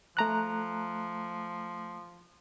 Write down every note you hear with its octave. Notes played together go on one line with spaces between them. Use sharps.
F3 A3 A#5 F#6